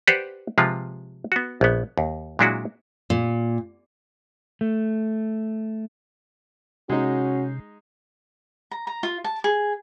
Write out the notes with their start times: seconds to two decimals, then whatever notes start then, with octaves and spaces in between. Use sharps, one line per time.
0.07 G4 B4 C5 D5 F#5
0.58 C3 F3 G#3 F4 B4
1.32 B3 F#4
1.61 A#1 B3
1.98 D#2
2.39 A#2 F#3 G#3 D4 E4 F#4
3.10 A#2
4.61 A3
6.90 C3 G#3 C#4 D#4 F#4
8.71 A#5
8.87 A#5
9.03 F4
9.24 A5
9.44 G#4